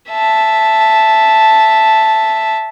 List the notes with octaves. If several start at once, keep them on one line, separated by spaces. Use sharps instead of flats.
E5 A5